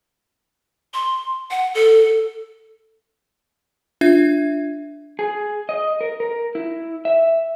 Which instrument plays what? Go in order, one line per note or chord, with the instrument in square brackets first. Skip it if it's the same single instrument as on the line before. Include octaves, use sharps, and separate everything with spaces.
[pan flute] C6
F#5
A4
[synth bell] D4 F4 E5 G#6
[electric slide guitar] G#4
D#5
A#4
A#4
E4
E5